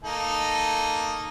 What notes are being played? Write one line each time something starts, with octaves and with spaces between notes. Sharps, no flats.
A#3 D#4 A4